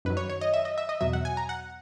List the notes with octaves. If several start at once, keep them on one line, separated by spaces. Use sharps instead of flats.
F#2 D#3 F#3 B4
C#5
C#5
D#5
E5
D#5
E5
D#5
E2 B2 F#3 E5
F#5
G#5
A#5
F#5